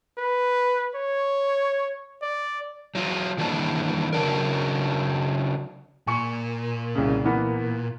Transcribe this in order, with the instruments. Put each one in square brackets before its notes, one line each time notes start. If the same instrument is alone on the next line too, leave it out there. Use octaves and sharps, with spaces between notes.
[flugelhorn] B4
C#5
D5
[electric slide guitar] F#3 F4
D#3 E3 G3 A#3 D4
C#3 F#3 D4 A#4
[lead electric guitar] A#2 [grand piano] G#5 C#6 C#7
[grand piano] C2 C#3
E3 A#3 B3